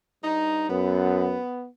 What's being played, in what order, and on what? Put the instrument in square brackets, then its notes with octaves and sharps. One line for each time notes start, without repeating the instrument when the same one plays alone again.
[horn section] G2 D#4
[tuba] F#2 [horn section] B3